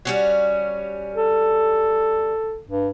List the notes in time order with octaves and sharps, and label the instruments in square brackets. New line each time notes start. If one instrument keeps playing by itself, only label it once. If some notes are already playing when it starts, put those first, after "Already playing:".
[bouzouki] G3 C#4 F#4
[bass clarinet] A4
G2